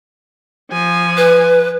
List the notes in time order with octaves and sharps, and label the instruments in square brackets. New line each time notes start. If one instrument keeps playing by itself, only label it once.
[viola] F3 G#5
[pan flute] B4